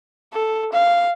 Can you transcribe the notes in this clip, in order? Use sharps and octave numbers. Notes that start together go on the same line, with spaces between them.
A4
F5